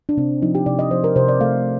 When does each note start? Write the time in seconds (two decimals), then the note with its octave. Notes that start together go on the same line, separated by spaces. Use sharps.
0.09 D4
0.17 C3 C4
0.42 F3 D#4
0.55 G4
0.66 C3 D5
0.79 D#5
0.91 F3 C5
1.04 A#4
1.16 C3 C5
1.28 D5
1.41 A3 F5